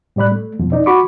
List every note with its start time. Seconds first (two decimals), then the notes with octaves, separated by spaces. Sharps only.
0.16 A2 G3 D5 B5 F#6
0.32 A3
0.59 F2 B2 F3
0.72 D#4 D5
0.86 F#4 B5 C#6 D6